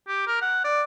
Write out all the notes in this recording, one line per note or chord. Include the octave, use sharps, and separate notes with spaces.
G4
A#4
F#5
D5